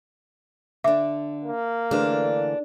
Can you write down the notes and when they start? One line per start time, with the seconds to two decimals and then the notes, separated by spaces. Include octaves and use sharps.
0.84 D3 D4 E5 D6
1.44 A#3
1.91 D3 E3 A3 D4 G#4 B4